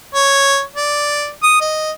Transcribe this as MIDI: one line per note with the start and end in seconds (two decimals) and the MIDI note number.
0.14 0.62 73
0.76 1.29 74
1.43 1.59 87
1.61 1.91 75